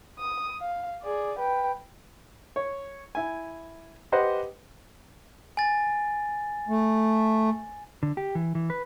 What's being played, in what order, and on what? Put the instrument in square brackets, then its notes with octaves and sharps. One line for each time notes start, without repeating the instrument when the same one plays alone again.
[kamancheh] D#6
F5
G#4 D5
B4 G5
[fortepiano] C#5
E4 G#5
G4 B4 C5 D#5 F#5
[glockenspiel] G#5 A6
[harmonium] A3
[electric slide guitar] D3
G4
E3
E3
B4